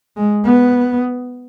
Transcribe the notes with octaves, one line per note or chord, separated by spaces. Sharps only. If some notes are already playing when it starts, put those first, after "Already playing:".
G#3
B3